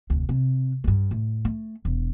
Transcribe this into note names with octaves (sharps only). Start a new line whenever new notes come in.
F1 D2
C3
G2 G#3
A2
A3
E1